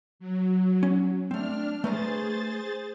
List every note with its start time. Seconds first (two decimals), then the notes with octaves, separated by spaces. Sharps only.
0.19 F#3
0.83 C#4
1.31 A3 C4 D4 F6
1.84 A3 G#4 B4 C5 A#5 A6